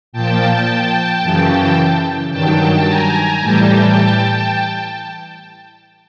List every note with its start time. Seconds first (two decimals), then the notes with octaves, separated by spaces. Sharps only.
0.13 A#2 F3 G5 A5
1.22 F#2 C#3 E3 G5 A5
2.31 G2 D#3 F#3 G5 A5
2.86 G#5 A#5
3.41 A2 E3 G3 G5 A5